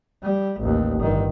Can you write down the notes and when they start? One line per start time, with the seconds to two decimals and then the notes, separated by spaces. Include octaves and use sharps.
0.23 G3
0.60 A1 D#2
0.99 G1 D#3